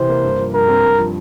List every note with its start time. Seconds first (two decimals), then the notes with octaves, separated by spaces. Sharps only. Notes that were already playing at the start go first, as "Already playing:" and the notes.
Already playing: C3 E3 C5
0.09 A#3
0.23 G2
0.39 F3
0.54 G2 A#4
0.68 C4
0.83 G2
0.99 F3